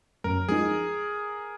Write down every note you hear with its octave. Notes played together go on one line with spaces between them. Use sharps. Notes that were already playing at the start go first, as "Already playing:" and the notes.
F#2 A#4
F3 G#3 D#4 G#4